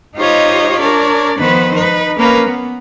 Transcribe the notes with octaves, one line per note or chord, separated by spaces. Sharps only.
D#4 F4 G4 C5 C#5 D#5
D4 A#4 C#5 D5
D#3 F3 B3 B4 C5
D#4 B4
A#3 C#4 A#4 B4
B3